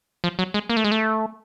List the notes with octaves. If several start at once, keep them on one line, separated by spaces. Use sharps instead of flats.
F3
F#3
G#3
A#3
A3
G#3
A3